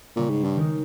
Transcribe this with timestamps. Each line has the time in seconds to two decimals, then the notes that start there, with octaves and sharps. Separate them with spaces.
0.16 A#2 C#3 G3 C#4
0.30 G#2
0.44 G2
0.56 D#3 G#3 D#4 A#4